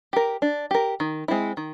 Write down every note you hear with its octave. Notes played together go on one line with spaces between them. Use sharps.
G4 A#4
D4
G4 A#4
D#3
G#3 C4 E4
D#3